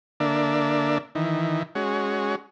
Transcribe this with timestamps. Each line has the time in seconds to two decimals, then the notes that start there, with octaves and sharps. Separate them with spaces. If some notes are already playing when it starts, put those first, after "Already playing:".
0.20 D3 A#3 D4 E5
1.15 D#3 E3
1.75 G#3 C#4 F#4